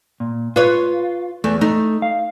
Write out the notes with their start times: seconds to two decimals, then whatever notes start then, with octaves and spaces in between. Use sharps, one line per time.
0.20 A#2
0.56 F4 B4 C#5
1.44 E2 A3
1.61 A3 D#4
2.02 F5